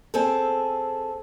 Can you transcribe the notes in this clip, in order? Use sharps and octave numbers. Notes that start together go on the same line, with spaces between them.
C4 G#4 A4